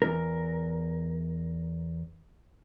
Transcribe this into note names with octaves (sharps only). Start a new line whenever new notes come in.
E2 A#4